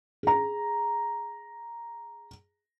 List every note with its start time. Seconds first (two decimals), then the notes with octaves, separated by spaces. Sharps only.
0.23 G#4 A#5